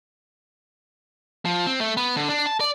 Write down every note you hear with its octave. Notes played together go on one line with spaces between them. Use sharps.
F3
C4
A3
B3
D3
D4
A5
D5